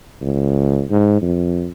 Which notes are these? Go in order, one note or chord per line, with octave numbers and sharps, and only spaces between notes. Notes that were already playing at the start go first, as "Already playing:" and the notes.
C#2
G#2
F2